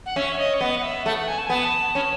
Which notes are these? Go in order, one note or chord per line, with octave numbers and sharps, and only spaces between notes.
F#5
C#4 E5
C#5
D#5
C#5
B3 D#5
F#5
E5
A3 F#5
F#5
G#5
A5
G#5
B3 A5
C#4